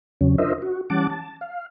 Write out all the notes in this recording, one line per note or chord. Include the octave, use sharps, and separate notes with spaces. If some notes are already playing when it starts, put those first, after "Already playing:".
E2 C#3 F#3 C#4
D4 F4 A#4 C5 D#5 E5
F#4
E3 G3 C#4 F#5 A5 D6
A5
F5